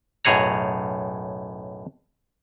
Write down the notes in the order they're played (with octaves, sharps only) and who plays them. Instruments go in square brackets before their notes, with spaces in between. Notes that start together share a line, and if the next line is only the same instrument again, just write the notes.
[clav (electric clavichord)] B1 F#2 A2 G#4 C#5 A#5